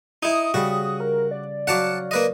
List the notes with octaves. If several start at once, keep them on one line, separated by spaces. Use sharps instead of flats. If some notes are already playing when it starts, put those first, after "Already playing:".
D#4 E4 D#6
C#3 G3 F#4
A#4
D5
F#3 F#4 F5 F#5 A5 D6
A#3 B4 D#5